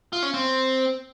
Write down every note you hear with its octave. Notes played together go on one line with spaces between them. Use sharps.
F4
C#4
C4